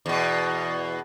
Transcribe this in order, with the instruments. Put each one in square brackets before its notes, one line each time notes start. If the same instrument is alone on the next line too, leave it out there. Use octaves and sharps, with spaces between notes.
[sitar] E2 B2